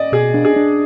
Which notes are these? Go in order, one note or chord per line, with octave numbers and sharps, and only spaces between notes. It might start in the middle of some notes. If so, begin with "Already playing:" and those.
Already playing: D5 D#5
B2 G#4
D4
G#4
D4